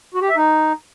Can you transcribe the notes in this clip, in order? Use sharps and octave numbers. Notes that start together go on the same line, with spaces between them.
F#4
G4
E5
D#4